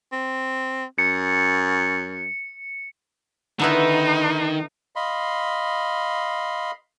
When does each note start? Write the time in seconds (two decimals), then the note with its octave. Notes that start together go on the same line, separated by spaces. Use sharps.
0.13 C4
0.98 F#2 C#7
3.60 D3 D#3 B3 D#4 E4
4.96 D#5 F5 B5 C6